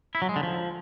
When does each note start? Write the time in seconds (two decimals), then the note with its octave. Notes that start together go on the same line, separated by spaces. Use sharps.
0.15 E4
0.22 F#3
0.29 G#3
0.36 D3
0.43 F3